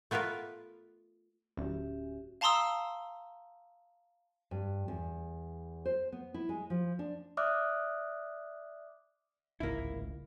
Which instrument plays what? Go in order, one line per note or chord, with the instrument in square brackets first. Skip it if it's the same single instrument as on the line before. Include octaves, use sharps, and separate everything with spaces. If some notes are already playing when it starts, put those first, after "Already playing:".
[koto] A3 B3 F4 A#4 B4
[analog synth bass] D1 [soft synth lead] C#4 [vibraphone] F#4 G4 E5
[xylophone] F5 A5 A#5 C6 D#6 E6
[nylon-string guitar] G2
E2
C5
B3
E4
G#3
F3
D4
[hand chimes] D5 E5 D6 D#6 F6 F#6
[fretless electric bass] D1 G#1 C#2 [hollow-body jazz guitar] A#3 E4